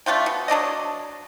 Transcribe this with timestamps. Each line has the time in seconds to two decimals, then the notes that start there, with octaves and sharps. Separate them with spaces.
0.06 A3 D4 F4 G5
0.26 B2
0.48 F#3 D4 D5 D#5